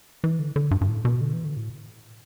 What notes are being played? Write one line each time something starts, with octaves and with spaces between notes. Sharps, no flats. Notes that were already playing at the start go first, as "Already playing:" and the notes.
E3
D3
D3
G2
G2
A2
B2
D3
E3
D3
A2